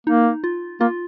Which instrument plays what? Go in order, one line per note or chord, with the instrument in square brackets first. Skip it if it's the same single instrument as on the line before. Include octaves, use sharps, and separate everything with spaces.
[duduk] A#3 [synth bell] D#4
[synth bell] F4
[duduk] A#3 [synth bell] F4